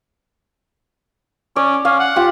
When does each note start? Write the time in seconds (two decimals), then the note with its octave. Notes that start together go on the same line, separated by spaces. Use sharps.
1.56 C#4 D5
1.85 C#4 F5
2.00 F#5
2.16 F4 G4